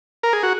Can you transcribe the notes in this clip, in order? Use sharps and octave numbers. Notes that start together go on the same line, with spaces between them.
A#4
G#4
F#4